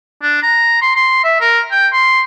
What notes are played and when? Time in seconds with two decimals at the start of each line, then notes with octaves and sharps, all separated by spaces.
0.22 D4
0.43 A#5
0.81 C6
0.96 C6
1.24 E5
1.41 A#4
1.71 G5
1.93 C6